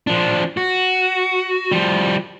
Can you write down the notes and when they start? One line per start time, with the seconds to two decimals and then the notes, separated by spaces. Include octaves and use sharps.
0.07 F3 D4
0.57 F#4
1.71 F3 G3